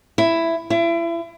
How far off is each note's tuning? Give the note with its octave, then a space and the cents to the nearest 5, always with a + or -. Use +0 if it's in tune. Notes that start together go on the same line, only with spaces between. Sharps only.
E4 +10
E4 +35